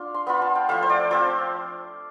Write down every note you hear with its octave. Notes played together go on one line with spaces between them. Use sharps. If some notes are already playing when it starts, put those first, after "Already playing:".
Already playing: D4 F4 D6
C6
B3 F4 B5
A5
G5
F3 A3 E4 F5
C5
D5
F3 C4 F4 C5